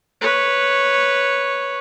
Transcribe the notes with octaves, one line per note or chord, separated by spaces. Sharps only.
B4 C#5